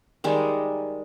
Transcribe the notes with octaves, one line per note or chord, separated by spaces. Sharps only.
D#3 G3 G#3